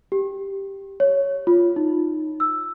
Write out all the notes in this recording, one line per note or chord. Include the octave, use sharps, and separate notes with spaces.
G4
C#5
F4
D#4
E6